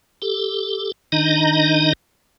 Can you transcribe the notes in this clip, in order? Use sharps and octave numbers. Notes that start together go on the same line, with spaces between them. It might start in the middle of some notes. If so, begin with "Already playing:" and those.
G4 A4
D#3 D4 D#4 D#5 A#5